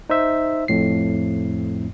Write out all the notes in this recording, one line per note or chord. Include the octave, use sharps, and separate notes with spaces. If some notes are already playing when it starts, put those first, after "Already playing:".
D#4 C5 E5
F2 A2 C7